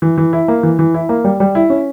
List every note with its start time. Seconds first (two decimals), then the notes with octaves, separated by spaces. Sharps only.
0.02 E3
0.18 E3
0.33 E4
0.48 A#3
0.63 E3
0.79 E3
0.94 E4
1.09 A#3
1.24 G3
1.40 G3
1.55 E4
1.70 C#4